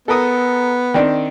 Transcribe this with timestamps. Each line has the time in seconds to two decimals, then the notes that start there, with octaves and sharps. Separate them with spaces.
0.08 B3 A4 A#4 D#6
0.94 D#3 C4 D4